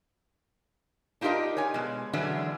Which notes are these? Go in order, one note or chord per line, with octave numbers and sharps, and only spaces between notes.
D4 D#4 F4 G4 A#4 D#5
C#5 G#5
B2 G#3
D3 E3 F#3 G#3 C#4 D4